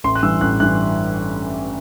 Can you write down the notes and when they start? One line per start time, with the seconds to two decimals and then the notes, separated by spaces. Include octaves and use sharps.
0.04 A1 C6
0.15 F#6
0.23 G2 E3 E6
0.41 A1 F#6
0.60 G2 E3 F#6